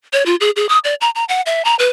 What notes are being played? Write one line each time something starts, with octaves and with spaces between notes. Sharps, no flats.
C#5
F4
G#4
G#4
D#6
D5
A#5
A#5
F#5
E5
A#5
B4